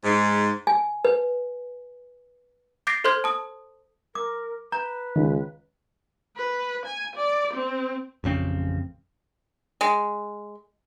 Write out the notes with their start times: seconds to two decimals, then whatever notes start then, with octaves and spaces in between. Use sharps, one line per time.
0.03 G#2
0.67 G#5
1.05 B4
2.87 D6 G6 A6 A#6 C7 D7
3.04 A4 C5 C6 F6 G6 G#6
3.24 A5 D#6
4.15 A#4 D6
4.72 B4 A#5 G6
5.16 C#2 D#3
6.37 B4
6.86 G#5
7.16 D5
7.54 C4
8.24 A1 F2 C#3 C4
9.81 G#3